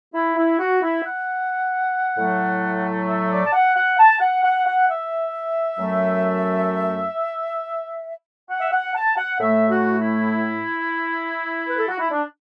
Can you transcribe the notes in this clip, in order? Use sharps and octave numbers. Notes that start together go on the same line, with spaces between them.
E4
E4
F#4
E4
F#5
A2 F#3 A3
E5
D5
A5
F#5
F#5
A5
F#5
F#5
F#5
E5
F#2 F#3 A3
F#5
E5
F#5
A5
F#5
A2 A3 E5
F#4
E4
B4
A4
F#4
E4
D4